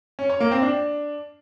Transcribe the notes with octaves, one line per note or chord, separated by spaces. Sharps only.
C#4
C#5
A#3
C4
D4